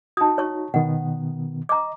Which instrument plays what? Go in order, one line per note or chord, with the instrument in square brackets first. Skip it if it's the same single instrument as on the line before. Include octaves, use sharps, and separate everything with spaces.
[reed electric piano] D#4 F#4 [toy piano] A5 D#6
[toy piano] C#5 C#6
[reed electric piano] B2 D#3 B3 [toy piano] F#5
[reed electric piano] D#5 [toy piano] A#5 D6